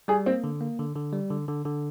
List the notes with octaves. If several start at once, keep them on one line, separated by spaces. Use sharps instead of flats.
G3 G#4
A#3 C4
D3
A#3
D3
D3
G3
D3
D3
D3